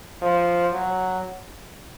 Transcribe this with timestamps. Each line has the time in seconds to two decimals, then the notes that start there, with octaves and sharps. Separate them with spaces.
0.22 F3
0.73 F#3